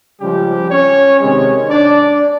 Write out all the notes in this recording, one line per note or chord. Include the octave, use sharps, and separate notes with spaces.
C#3 F3 G3 G#3 G4
C#4 C#5
C3 D#3 G#3 C#4 C#5
D4 D5